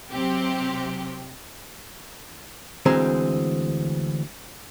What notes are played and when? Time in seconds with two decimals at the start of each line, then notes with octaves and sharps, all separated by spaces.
0.10 C3 F#3 C4 G4
2.86 D2 E3 G#3 C4 A#5